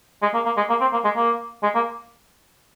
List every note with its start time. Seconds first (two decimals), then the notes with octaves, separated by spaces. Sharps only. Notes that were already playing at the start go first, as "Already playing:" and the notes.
0.22 G#3
0.34 A#3
0.45 A#3
0.57 G#3
0.69 A#3
0.80 C4
0.92 A#3
1.04 G#3
1.16 A#3
1.63 G#3
1.75 A#3